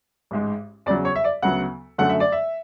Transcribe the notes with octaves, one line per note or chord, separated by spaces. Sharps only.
A1 G#2 G#3
E2 C#3 F#3 D5
C#5
E5
D5
D2 C#3 F#3 B3 F#5
F#2 D3 F#3 A3 F#5
E5
D5
E5